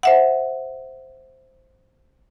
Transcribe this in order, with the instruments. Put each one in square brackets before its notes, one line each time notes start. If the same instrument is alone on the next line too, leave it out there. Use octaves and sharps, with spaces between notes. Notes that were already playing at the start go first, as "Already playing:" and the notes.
[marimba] C5 E5 F#5